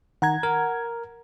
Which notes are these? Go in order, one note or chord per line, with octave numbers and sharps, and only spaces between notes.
D#3 F#5 A#5 G#6
A#4